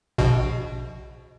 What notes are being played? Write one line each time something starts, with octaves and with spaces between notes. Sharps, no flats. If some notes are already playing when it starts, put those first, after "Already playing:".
A#1 B2